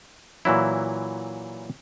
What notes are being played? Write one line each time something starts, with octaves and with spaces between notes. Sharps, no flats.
A#2 E3 F#3 E4